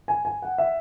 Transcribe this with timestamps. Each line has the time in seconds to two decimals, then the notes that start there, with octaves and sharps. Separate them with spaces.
0.08 G#5
0.25 G#5
0.42 F#5
0.58 E5